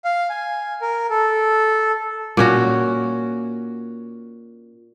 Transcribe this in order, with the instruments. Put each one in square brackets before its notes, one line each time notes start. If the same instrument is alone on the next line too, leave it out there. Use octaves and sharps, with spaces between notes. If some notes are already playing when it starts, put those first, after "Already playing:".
[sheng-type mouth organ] F5
G#5
A#4
A4
[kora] A#2 C#4 F#4